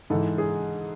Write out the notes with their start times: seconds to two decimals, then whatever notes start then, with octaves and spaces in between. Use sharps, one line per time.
0.10 G#2 E3 A4
0.38 G#4